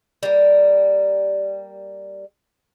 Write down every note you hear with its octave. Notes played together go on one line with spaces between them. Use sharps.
G3 A#3